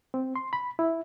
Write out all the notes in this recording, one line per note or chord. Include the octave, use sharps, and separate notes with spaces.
C4
C6
B5
E4